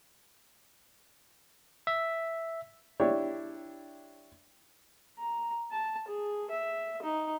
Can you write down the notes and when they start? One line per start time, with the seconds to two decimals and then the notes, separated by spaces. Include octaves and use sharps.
1.87 E5
3.00 D4 E4 G4 C#5
5.18 A#5
5.71 A5
6.08 G#4
6.51 E5
7.02 D#4